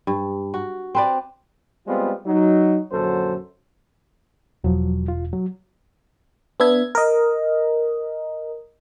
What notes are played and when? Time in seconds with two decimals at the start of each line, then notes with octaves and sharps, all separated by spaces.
0.07 G2
0.54 F#4
0.95 C4 B4 D5
1.87 G3 G#3 B3 C4 F4
2.27 F#3 D#4
2.92 A#1 F#2 D3 F#3 A4 C5
4.64 E1 F3 F#3
5.08 F4
5.33 F#3
6.60 B3 D4 E5 G#6
6.95 A#4 D#5